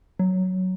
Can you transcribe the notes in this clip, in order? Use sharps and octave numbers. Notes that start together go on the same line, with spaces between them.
F#3